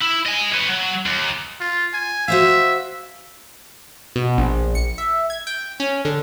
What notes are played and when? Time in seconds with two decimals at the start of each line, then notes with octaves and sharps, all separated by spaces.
0.02 E4
0.25 D#5 G#5
0.52 B4 C#5
0.68 F#3
1.06 D#2
1.60 F4
1.94 G#5
2.28 F#4 C5 E5 F5
4.16 B2
4.38 A#1
4.75 C#7
4.98 E5
5.30 G#6
5.47 G5
5.80 C#4
6.05 D3